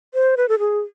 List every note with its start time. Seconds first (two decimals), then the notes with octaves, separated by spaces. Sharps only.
0.14 C5
0.37 B4
0.49 A4
0.59 G#4